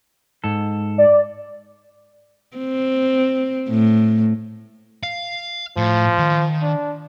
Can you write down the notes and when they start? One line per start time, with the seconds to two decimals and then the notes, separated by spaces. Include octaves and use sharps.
0.44 G#2 A4
0.98 D5
2.57 C4
3.70 A2
5.03 F5
5.77 A2 F3
6.19 D#3
6.62 D4